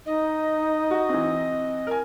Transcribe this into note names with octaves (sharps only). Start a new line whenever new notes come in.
D#4 D#5
F#4
E3 C4
A#4 G#5